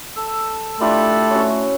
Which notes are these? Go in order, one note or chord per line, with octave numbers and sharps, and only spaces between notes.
A4 E6
A3 D4 E4 F4 G4 A4 B5
C#4 F#4 C#5